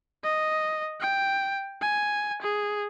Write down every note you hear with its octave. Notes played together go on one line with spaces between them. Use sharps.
D#5
G5
G#5
G#4